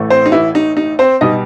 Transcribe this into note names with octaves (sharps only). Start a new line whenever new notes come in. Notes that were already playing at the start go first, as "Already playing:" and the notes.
Already playing: A1 A2 E3 A3
C4 C5
D#4
E3 E4
D#4
D#4
C4 C5
B2 G3 D#4 D#5